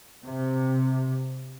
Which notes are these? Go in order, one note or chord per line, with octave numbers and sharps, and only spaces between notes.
C3